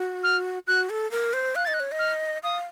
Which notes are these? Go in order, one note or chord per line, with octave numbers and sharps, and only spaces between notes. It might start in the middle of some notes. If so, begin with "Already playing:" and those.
Already playing: F#4
F6
F#4 F#6
A4
A#4
C5
F5 F#6
D#5 A6
F#6
C#5
D#5
F6
F5 D#6